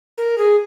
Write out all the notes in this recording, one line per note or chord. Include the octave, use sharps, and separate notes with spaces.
A#4
G#4